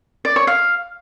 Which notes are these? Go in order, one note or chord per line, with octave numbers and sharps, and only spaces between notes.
D5
C#5
F5